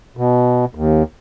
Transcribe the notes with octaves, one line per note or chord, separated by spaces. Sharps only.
B2
D#2